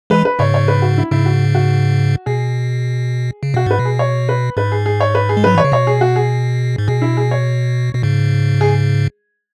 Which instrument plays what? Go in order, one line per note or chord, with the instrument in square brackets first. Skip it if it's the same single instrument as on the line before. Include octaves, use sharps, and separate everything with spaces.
[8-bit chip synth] E3 G#3 [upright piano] B4
[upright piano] B4
[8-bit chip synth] G#2 C#3 [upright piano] C#5
[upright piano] C#5
B4
F#4
E4
[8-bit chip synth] G#2 C#3 [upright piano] E4
[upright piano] F#4
F#4
[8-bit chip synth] B2 [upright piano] G#4
[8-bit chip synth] C#3
[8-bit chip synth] B2 [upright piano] F#4
[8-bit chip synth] G#2 [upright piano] B4
[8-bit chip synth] B2
[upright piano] G#4
C#5
B4
[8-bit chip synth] G#2 [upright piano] B4
[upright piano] G#4
G#4
C#5
B4
G#4
[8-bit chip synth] G#3
[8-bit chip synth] F#3 [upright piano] B4
[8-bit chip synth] E3 [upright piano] C#5
[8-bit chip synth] C#3
[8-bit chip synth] B2 [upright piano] C#5
[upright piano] G#4
F#4
G#4
[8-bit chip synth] G#2
[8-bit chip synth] B2 [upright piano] G#4
[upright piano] E4
G#4
C#5
[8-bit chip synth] B2
G#2 C#3
[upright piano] G#4